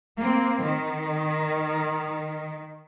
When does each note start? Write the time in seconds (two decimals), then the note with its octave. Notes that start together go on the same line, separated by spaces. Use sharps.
0.17 A#3 C4
0.63 D#3